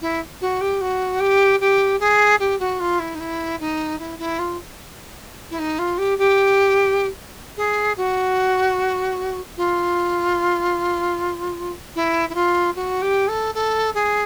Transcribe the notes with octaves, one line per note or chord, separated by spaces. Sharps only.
E4
F#4
G4
F#4
G4
G4
G#4
G4
F#4
F4
E4
D#4
E4
D#4
E4
E4
F4
E4
D#4
F4
G4
G4
G#4
F#4
F4
E4
E4
F4
F#4
G4
A4
A4
G#4